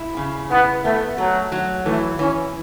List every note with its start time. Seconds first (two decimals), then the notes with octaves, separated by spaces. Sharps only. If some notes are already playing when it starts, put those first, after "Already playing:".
Already playing: E4
0.17 C#3
0.50 B3 E4
0.84 A3 B3
1.18 F#3 A3
1.52 F#3
1.85 E3 A3
2.19 E3 C#4